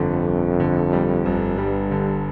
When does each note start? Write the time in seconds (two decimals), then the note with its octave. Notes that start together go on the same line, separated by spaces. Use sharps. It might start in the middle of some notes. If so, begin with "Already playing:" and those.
Already playing: G1 F2 D3
0.27 G1
0.60 D3
0.93 G3
1.26 G1
1.58 G2 G3
1.91 D3